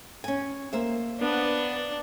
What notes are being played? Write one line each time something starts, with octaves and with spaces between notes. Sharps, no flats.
C#4 G#5
A#3 C5 E5
B3 D4